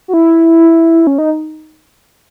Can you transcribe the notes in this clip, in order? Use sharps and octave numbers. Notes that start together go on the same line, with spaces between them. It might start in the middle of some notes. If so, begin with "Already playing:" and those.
F#4
E4
C#4
D#4